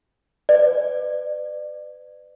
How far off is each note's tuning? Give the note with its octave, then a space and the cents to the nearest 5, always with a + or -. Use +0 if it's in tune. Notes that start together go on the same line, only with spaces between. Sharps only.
B4 +35 D5 +30